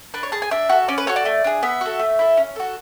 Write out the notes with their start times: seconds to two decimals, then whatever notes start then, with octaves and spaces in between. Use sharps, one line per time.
0.14 D4 B4
0.23 C#5
0.32 G#4 A5
0.42 G#5
0.51 D4 E5
0.69 F#4 A4
0.88 C#4 D5
0.98 B4
1.07 F#4 A4 C#5
1.16 D5
1.25 A3
1.44 D4 G#4
1.63 B3 E5
1.81 F#4 A4
1.99 A3
2.19 E4 A4
2.37 C#4
2.56 F#4 A4